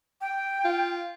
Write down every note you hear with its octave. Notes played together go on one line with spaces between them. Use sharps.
G5
F4